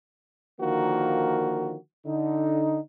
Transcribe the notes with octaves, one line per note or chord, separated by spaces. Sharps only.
D3 D#3 F3 A#3 F#4 A#4
D3 D#4